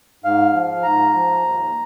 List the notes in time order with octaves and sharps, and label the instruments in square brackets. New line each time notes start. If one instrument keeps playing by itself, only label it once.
[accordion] G#2 F5
F3
G#2 A#5
F3
D#2